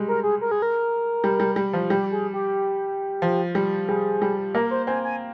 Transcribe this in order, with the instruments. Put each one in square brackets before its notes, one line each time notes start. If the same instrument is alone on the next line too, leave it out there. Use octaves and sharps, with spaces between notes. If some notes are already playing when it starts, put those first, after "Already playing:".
Already playing: [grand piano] G3 G#3
[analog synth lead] A#4
G#4
A#4
G#4
A#4
[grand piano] G3
G3
G3
F3
[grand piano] G3 [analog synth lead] G4
[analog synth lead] G#4
G4
[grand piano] F3
G3
[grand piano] G3 [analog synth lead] G#4
[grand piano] G3
[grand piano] A#3 [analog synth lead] A#4
[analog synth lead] C5
[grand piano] C4 [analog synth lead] G#5
[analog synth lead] G#5